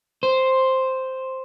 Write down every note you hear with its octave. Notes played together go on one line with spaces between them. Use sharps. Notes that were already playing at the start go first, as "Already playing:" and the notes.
C5